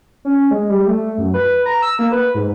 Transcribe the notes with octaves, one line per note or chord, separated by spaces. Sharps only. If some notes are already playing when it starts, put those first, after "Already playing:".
C#4
G#3
G3
A3
F#2
B4
A#5
E6
A#3
B4
G#2